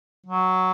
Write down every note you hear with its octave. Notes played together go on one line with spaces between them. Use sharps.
F#3